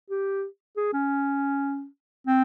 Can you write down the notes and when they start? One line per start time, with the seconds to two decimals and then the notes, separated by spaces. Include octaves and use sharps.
0.10 G4
0.76 G#4
0.93 C#4
2.27 C4